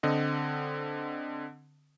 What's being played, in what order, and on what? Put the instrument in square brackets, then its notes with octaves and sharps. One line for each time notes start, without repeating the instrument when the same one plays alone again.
[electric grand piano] D3 C4 D#5